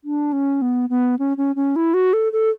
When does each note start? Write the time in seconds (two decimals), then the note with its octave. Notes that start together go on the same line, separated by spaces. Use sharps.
0.04 D4
0.33 C#4
0.62 B3
0.90 B3
1.19 C#4
1.37 C#4
1.56 C#4
1.76 E4
1.94 F#4
2.13 A4
2.33 A4